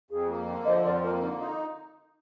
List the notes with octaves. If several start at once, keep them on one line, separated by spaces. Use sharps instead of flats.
F2 G#4
A#3
D3
F3 C5 D#5
F2 A#4 D5
C5
A#3 A#4
D3 D#4
D#4 F4